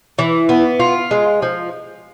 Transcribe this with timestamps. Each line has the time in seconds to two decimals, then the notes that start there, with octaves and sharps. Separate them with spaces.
0.19 E3
0.49 B3
0.80 F4
1.11 G#3
1.42 F3